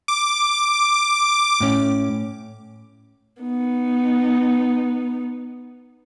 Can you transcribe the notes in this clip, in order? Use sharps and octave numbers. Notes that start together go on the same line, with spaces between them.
D6
A2 C#4
B3 D#4